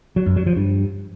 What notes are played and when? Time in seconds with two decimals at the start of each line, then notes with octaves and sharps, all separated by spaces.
0.16 F#3
0.26 F#2
0.36 F#3
0.46 F3
0.56 G2